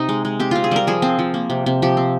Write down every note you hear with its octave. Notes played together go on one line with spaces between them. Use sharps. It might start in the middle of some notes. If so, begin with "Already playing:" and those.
Already playing: C3 D#4
G#3
G#3
C4 G4
C4 F4
G#4
G3 A#4
F3 G#4
C4
F3
A#3
C3
C3
F3 G4
C4